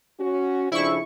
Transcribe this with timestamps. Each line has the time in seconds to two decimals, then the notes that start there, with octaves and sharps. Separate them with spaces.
0.20 C#4 F#4
0.72 F2 C#3 D4 E4 C#6